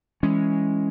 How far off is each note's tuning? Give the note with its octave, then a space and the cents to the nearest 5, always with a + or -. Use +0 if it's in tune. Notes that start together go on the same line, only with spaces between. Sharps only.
E3 +0 G#3 +0 C#4 +0